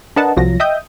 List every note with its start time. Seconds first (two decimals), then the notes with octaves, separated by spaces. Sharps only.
0.16 D4 A#4 B4 D#5 F#5 A5
0.37 C2 F3 F#3 A#6
0.60 D#5 E5 G5 D#6 G6